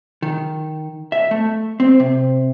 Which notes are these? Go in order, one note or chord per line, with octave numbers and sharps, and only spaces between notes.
D#3
E5
A3
C4
C3